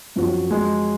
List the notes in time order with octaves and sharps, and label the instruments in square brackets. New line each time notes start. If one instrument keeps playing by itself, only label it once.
[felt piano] F#2 F3 C4 F#4
[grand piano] G#3